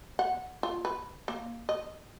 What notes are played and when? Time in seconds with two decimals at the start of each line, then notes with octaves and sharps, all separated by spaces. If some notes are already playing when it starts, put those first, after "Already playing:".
0.19 F#5
0.63 F4
0.85 B4
1.28 A#3
1.69 D#5